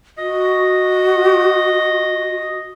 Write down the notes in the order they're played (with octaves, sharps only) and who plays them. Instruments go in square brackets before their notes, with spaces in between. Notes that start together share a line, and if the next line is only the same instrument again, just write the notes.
[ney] F#4 [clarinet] D#5